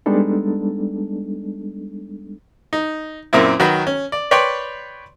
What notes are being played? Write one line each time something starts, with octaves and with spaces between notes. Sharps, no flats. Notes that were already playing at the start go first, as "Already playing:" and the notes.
G3 G#3 B3 D4 D#4 A4
D#4
F#2 A#2 A#3 C4 E4
D#3 F#3 F#4 B4
C#4
D5
B4 C#5 D5 G5 B5 C6